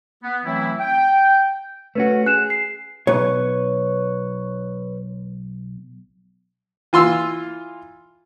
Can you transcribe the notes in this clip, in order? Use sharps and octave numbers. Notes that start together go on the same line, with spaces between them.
B3
E3 F#3 A3 C4 E4
G5
A3 C#4 F#4 B4
G#4 F#6 E7
C7
B1 B4 C#5
E3 F4 C6 E6